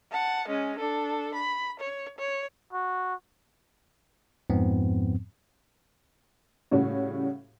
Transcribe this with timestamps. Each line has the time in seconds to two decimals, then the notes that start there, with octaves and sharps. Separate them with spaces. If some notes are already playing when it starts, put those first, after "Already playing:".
0.11 F#5 A5
0.48 G#3 C#4
0.79 D4 A4
1.35 B5
1.80 C#5
2.18 C#5
2.73 F#4
4.50 F2 G#2 F3 B3 C4
6.71 A2 C#3 G3 C#4 F#4